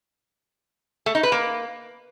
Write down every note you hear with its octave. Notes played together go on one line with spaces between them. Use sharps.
A3
D#4
B4
A#3